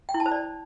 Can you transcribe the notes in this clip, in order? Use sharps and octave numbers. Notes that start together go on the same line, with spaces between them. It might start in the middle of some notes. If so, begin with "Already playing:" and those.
G5
E4
A5
C5
D5